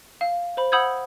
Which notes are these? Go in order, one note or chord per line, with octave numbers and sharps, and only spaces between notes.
F5
C5 B5
F#5 B5 D#6 E6 G6 G#6